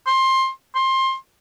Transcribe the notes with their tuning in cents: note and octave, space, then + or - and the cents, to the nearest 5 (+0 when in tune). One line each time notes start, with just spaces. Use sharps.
C6 +20
C6 +20